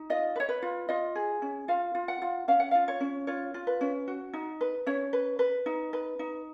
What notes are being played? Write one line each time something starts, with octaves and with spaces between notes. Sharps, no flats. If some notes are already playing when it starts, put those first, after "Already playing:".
Already playing: D#4
F4 D#5
B4
C#5
B4
F4
F4 D#5
G#4
C#4
F4 F5
F4
F#5
F4
C#4 F5
F#5
F4 F5
C#5
C#4
F4 C#5
F4
B4
C#4
F#4
D#4
B4
C#4 C#5
B4
B4
D#4
B4
D#4